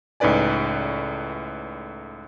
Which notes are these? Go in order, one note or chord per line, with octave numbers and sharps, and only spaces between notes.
C#2 A2 D#4 B4 D5 G#5